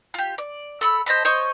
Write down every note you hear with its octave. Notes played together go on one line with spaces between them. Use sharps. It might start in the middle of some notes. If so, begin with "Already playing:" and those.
F4 G4
D5
A4 B5 E6
C5 D#5 A5 B5
C5 C#5 D#5 C#6